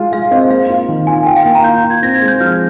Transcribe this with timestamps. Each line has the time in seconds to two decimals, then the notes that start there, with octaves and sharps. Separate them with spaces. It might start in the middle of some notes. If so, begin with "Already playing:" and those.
Already playing: G#3 F4
0.12 G#3 F5
0.31 C4 D#5
0.50 A#3 F5
0.69 F4
0.89 D#3
1.07 F4 G#5
1.26 F4 G5
1.36 F5
1.45 A#3 G5
1.55 A#5
1.64 F4 G6
1.84 F4
1.90 G#6
2.02 C4 A#6
2.14 G#6
2.22 G#3
2.28 G6
2.40 F3 F6